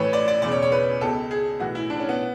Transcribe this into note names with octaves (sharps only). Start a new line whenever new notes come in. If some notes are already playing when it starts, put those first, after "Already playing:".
Already playing: A1 A2 E3 B4 C#5
D5
D5
E1 E2 C#3 D5
C#5
C#5
B4
C#2 B2 A4
G#4
B1 A2 E3 F#4
E4
D4
C#4
B3